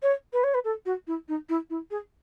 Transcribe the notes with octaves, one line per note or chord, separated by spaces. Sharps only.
C#5
B4
C#5
B4
A4
F#4
E4
D#4
E4
E4
G#4